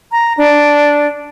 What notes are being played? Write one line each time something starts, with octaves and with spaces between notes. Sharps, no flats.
A#5
D4